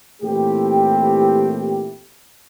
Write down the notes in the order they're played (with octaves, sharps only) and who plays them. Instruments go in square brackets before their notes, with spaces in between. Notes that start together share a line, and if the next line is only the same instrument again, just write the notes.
[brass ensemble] A#2 E3 A3 C4 E4 G4